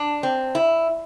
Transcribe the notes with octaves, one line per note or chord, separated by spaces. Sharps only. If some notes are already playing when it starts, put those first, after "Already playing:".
Already playing: D4
C4
E4